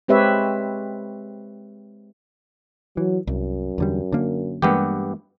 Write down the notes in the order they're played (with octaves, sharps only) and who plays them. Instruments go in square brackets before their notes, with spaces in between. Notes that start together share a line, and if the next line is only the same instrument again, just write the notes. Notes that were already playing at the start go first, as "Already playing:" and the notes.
[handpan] G#3 C4 G4 B4 C#5 E5
[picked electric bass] E3 [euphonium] F#3
[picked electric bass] C2 [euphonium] F#2
[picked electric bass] E2 D3 G3
D3 A#3
[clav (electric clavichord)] G2 B3 G4 [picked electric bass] E3 G#3 A#3